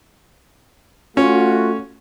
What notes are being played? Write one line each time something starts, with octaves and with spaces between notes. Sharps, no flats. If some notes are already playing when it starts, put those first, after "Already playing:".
A3 C#4 F4 F#4